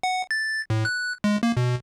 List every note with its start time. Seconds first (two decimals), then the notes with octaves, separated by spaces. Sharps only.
0.03 F#5
0.31 A6
0.70 A2
0.85 F#6
1.24 G#3
1.43 A#3
1.57 B2